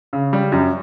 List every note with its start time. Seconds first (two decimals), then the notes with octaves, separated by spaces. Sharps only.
0.13 C#3
0.33 G3
0.52 F#2